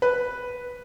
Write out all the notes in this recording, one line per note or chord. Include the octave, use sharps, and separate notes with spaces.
B4